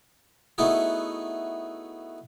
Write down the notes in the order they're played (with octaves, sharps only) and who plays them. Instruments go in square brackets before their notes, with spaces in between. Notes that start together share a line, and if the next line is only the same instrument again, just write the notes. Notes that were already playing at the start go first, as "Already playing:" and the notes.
[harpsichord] A3 B3 D#4 E4 F#4 G#4